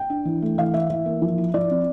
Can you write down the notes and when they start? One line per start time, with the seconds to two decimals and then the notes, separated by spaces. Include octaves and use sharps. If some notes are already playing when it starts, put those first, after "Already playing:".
Already playing: G5
0.10 D4
0.25 E3
0.42 A3
0.58 E3 F5
0.74 E3 E5
0.90 E3 E5
1.06 A#3
1.22 F3
1.38 E4
1.54 F3 D5
1.71 C4